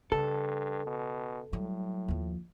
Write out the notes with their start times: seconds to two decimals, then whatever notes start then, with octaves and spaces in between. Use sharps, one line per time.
0.12 G2 C#3 A4
0.86 B2
1.53 A2 F#3 G3
2.08 D#2 F3